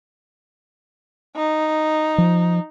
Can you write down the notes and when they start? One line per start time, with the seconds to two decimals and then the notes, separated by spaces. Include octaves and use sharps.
1.36 D#4
2.18 F3